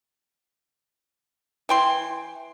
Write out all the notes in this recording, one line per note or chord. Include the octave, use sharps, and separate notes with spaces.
E3 G5 C6